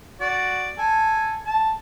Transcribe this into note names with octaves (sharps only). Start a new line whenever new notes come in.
F#4 D5
A4 G#5
A5